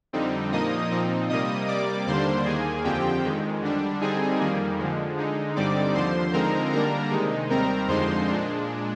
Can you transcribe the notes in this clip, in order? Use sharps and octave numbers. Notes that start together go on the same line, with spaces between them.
F2 D3 G3 C4 D#4
A#2 F3 A#3 D#4 D#5 D#6
A#2 F3 C4 D#4
C3 G3 A#3 D#5 D#6
C3 G3 A#3 D5 D6
D#2 D3 G3 A#3 D4 C5 C6
D#2 D#3 A#3 G#4 G#5
F2 D3 F3 C4 G4 G5
F2 D#3 G#3
D3 G3 D4
D3 G3 C4 D#4 G#4 G#5
F2 D#3 G3 A#3
D3 F3 G#3
D3 G#3 D#4
G2 D3 G3 C4 D#4 D5 D6
D#2 D3 F3 C5 C6
D3 F3 G#3 C4 D#4 A#4 A#5
D3 G3 A#3 D4 A#4 A#5
C3 D#3 G#3 D#4
D#2 D#3 G3 C4 A#4 A#5
F2 D3 F3 G#3 D#4 C5 C6
A#2 G#3 D4